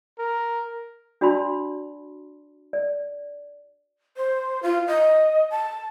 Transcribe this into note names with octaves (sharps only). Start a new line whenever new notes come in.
A#4
D4 F#4 D5 A5 B5 C6
D5
C5
F4
D#5
A5